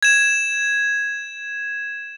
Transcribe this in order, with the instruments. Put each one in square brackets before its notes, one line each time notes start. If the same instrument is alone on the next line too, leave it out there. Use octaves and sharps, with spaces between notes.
[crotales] G#6 E7